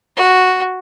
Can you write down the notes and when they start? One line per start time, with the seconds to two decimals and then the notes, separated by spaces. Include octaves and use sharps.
0.17 F#4